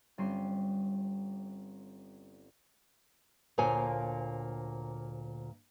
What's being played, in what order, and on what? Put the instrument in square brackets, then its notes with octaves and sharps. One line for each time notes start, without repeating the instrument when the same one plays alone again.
[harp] G1 G3 C4 C#4 C6
[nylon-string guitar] D2 A#2 A#3 C5 C#5 G#5